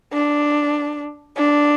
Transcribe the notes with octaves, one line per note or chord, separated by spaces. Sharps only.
D4
D4